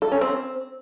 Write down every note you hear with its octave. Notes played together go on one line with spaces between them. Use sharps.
A4
C#4
C4